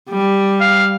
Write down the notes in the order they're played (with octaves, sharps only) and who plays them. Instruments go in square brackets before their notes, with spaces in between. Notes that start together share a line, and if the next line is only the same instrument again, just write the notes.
[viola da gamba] G3
[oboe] F5